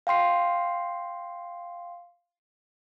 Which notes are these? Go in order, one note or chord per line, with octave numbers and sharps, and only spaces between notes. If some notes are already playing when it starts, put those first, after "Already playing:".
F5 G5 C6 C7